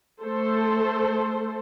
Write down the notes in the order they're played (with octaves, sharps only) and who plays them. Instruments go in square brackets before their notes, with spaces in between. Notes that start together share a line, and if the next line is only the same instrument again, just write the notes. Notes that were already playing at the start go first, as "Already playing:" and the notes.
[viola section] A3 A4 C5